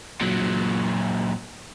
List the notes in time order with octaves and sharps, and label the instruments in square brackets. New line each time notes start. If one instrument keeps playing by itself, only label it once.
[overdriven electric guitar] A#2 F#3